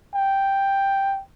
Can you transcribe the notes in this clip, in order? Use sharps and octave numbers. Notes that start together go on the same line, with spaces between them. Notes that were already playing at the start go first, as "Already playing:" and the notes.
G5